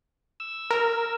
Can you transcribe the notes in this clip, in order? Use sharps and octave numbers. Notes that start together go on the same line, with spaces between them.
E6
A#4